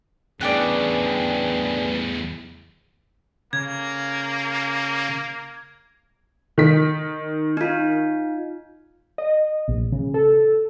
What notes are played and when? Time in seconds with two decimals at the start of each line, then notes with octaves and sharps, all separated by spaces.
0.41 E2 C#3 E3 D4 G#4 D5 G5 F#6
3.53 C#3 A#3 G#6
6.58 D#3 B6
7.57 D#4 F4
9.18 D#5
9.68 A#1
9.92 C#3
10.14 A4